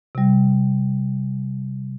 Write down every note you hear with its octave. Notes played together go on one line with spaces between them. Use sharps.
C3 G3